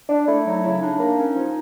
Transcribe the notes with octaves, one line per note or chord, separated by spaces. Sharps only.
D4
A3 E4
F#3 D#4
C#3 E4
D4 D#4
A#3 D#4
C#4
F3